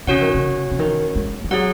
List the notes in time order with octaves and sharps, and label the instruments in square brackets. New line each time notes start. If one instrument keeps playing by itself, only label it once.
[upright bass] C#3 [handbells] C#4 F#4 C#5 F#5
[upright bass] D#3
C#3
C#3
D#3
G#3
D#3
[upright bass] F#3 [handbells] G#4 C#5 F#5